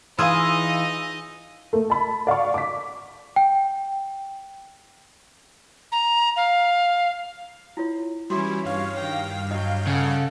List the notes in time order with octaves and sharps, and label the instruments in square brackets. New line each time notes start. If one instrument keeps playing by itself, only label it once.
[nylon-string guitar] E3 [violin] D#4 D#5 [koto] F4 G#4 [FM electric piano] F5 E6
[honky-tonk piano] A3 A#3
A5 B5
D5 F5 F#5 C#6
D6 B6
[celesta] G5
[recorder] A#5
F5
[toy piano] E4 F4 C#5
[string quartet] E3 C#4 E4 [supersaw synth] G3 [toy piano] F#4 C6 D6
[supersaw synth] G2 F5 [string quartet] C#5
[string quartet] D#3 G5 A#6
[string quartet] F#3 G6 [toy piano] D#5
[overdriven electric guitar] C#3 [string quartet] A4 F#5